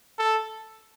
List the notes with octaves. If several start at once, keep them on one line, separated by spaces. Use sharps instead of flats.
A4